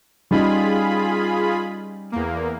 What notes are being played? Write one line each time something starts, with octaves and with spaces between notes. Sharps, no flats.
G3 C#4 D#4 F4 G#4 B5
E2 A#3